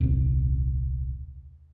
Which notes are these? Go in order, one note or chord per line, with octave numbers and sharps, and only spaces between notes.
D#1 C2